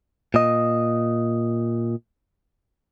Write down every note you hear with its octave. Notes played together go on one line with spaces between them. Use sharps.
A#2 D#5